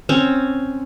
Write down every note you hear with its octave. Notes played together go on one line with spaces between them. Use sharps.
C4 C#4